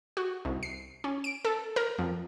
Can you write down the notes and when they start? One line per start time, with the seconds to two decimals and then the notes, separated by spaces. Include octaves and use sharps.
0.17 F#4
0.45 C2
0.63 C7
1.04 C#4
1.24 D7
1.45 A4
1.76 A#4
1.98 F2